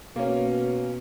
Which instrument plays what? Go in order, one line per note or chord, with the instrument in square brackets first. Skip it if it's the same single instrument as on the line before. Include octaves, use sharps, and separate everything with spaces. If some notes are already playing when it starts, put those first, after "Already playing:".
[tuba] B2 [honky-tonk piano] A#3 C#4